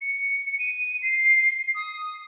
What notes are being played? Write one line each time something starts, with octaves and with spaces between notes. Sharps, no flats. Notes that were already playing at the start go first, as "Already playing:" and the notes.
C#7
D#7
C7
D#6